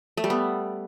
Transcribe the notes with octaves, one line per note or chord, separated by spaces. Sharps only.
A3
G3
B3